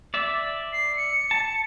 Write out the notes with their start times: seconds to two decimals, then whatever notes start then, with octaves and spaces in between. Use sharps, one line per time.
0.14 D5 E5
0.73 C7
0.97 C#7
1.31 A5